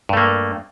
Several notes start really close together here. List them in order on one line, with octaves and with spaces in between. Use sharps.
G2 A3 A#3